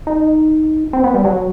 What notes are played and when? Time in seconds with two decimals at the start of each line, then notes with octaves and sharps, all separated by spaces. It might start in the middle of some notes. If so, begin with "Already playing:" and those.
0.07 D#4
0.93 C4
1.04 B3
1.14 G3
1.25 F#3